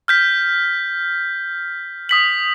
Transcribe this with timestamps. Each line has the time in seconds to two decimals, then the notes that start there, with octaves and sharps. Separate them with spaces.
0.08 F6 G6 B6
2.09 D#6 B6 F#7